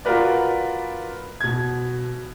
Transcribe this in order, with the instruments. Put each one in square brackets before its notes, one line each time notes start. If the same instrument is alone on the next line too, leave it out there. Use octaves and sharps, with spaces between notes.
[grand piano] F4 F#4 A#4 B4 D5
B2 G#6